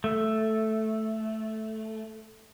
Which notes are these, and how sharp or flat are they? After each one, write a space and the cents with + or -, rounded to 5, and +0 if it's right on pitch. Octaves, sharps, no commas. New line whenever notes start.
A3 -5